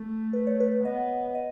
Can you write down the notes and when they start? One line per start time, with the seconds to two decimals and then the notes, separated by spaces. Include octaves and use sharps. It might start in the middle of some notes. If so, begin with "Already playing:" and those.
Already playing: A3
0.33 B4
0.47 C#5
0.60 B4
0.84 B3 D#5
1.35 D#5